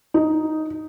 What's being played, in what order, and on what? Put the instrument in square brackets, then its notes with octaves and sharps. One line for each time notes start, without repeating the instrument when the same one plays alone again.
[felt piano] D#4